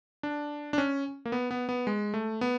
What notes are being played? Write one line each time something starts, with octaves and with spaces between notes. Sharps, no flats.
D4
D4
C#4
A#3
B3
B3
B3
G#3
A3
B3